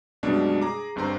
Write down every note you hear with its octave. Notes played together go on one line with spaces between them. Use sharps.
F#2 B2 G3 G#3 D4
G#4 A#5 D6
G1 G2 C4 A#5 C6